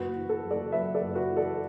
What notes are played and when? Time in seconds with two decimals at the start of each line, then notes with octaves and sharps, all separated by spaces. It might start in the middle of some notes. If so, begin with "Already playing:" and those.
Already playing: F#1 F#4 B4
0.16 E3
0.29 A4
0.44 F#1
0.51 A4 D5
0.72 F#2 B4 E5
0.94 A4 D5
1.01 F#1
1.15 F#4 B4
1.31 E3
1.37 A4 D5